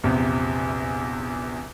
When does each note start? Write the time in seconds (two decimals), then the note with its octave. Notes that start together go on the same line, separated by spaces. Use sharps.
0.04 A#1 E2 C3